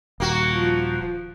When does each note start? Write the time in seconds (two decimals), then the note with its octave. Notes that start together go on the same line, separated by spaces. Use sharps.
0.20 D#1 A#3 F#4
0.53 F3